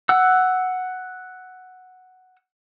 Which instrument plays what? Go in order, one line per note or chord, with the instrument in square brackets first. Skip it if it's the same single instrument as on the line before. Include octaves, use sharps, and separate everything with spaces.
[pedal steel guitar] F#5 E6